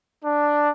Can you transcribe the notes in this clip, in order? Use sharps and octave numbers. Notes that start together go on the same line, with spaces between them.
D4